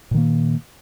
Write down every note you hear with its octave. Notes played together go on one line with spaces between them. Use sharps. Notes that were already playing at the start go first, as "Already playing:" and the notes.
A#2 D#3 A#3